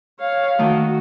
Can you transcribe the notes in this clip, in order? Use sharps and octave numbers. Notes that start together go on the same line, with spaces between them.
C#5 F5
D#3 A3 F#4